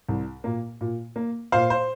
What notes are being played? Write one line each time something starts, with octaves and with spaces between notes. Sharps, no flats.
C2
A#2 A#3
A#2
A#3
A#2 C5 F5
C5